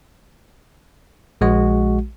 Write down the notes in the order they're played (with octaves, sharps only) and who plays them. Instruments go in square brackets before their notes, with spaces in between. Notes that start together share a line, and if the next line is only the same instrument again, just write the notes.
[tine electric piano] A#1 G#3 F#4